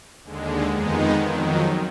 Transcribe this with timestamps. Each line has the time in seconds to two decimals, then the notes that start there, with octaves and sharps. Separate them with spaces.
0.24 D#2 D3 G#3
0.72 F2 D#3 G#3 B3 D#4
1.21 F2 D#3 F#3